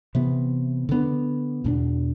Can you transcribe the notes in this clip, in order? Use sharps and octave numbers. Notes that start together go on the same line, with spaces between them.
C3 E3 B3
D3 F3 B3 D4
E2 B2 A3 D4